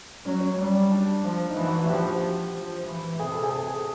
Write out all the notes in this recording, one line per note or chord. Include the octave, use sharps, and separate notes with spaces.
F#3 C#4
C#4
G3
D4
F3
D#4
E3 D4
F#4
F#4
F3 G4
F3
E3
C3 G#4
A4
G#4
A4
G#4